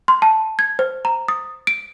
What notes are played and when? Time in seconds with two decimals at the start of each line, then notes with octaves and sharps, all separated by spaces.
0.08 C6
0.22 A5
0.59 G#6
0.79 C5
1.05 A#5
1.28 D#6
1.67 D7